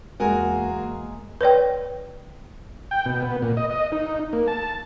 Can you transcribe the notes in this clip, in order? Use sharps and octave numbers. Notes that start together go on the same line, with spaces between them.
E2 G#3 A#3 F#4 A#4 G#5
B4 C#5 D5 G5
G5
B2
B3
A#2
D#5
D#5
D#4
A#3
A5